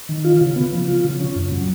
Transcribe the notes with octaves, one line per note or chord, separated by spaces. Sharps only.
D#3
F4
C#3
B3
F3
F4
C#3
C#4
F#2
F#3